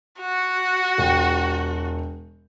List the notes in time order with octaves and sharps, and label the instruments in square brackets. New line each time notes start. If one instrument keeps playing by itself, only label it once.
[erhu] F#4
[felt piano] E1 G5